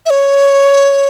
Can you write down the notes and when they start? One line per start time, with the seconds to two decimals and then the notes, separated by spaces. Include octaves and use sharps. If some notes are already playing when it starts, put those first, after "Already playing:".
0.06 E5
0.10 C#5